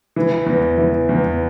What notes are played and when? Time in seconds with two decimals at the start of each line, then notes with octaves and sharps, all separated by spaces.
0.16 E3
0.46 E2
0.78 E3
1.09 E2